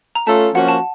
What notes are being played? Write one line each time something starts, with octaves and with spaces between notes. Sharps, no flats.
A#5
A3 C#4 F4 A4 A5
F3 A#3 C#4 F#4 F#5
A5